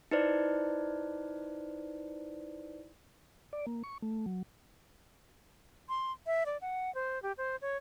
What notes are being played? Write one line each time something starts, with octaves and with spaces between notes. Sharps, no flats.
D#4 E4 B4 C5 D5
D5
A#3
C#6
A3
F#3
C6
E5
D5
F#5
C5
G4
C5
C#5